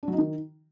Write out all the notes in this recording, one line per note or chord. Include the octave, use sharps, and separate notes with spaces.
D4
F#3
D#4
D#3